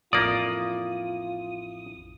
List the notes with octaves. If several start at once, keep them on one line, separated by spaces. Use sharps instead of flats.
A1 F2 A#3 E4 F4 D5 D#6